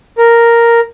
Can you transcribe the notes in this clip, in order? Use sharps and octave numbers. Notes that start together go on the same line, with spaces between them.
A#4